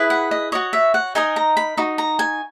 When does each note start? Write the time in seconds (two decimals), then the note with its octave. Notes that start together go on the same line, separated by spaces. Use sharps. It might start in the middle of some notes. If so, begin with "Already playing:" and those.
Already playing: E4 G#4 B4
0.10 F#5
0.31 D#5
0.52 F#4 C#5 D#5
0.73 E5
0.94 F#5
1.15 D#4 A#4 D#5 G#5
1.36 A#5
1.57 B5
1.77 D#4 F#4
1.98 A#5
2.19 G#5